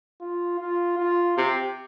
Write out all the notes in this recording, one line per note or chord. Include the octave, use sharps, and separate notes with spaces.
F4
F4
F4
C3 G4